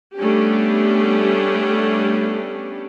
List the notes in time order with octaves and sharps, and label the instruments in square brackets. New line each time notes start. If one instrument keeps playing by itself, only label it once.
[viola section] G3 A3 B3 C#4 D4 G4